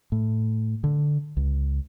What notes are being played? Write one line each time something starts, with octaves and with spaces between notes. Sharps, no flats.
A2
D3
C#2